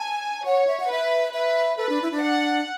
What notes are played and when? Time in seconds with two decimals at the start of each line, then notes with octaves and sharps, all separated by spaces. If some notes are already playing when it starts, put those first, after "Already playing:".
Already playing: G#5 A5
0.45 C#5 F#5
0.67 E5
0.80 F#5
0.90 B4 E5
1.33 B4 E5
1.77 A4 B4
1.89 D4
2.02 E4
2.11 D4
2.22 F#5